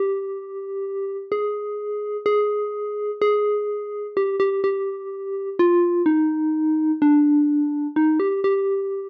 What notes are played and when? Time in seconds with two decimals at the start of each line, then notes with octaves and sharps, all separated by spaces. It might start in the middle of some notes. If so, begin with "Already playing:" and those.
Already playing: G4
1.32 G#4
2.26 G#4
3.22 G#4
4.17 G4
4.40 G4
4.64 G4
5.59 F4
6.06 D#4
7.02 D4
7.96 D#4
8.20 G4
8.44 G4